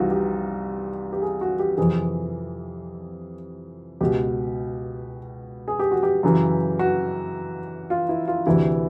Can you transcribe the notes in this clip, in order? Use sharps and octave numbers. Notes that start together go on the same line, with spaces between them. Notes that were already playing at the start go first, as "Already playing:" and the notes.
Already playing: C2 C3 E3 D#4 F4 F#4
G4
G4
G#4
F#4
G4
F2 C3 E3 G#4
C#2 B2 G4
G#4
G4
F#4
G4
F#2 C#3 E3
F#4
F4
E4
F4
D2 C3 E3 E4